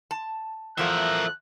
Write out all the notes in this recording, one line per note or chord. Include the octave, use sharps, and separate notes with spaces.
A5
E2 F3 A3 A#4 E5 F#6